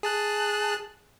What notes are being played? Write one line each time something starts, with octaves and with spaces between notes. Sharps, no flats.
G#4 A5 F#6